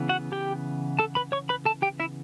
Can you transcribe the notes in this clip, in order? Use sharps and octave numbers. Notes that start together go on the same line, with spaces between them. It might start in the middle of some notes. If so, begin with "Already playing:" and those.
Already playing: C#3 E3 B3
F#4 F#5
G4 G5
A4 A5
B4 B5
C#5 C#6
B4 B5
A4 A5
G4 G5
E4 E5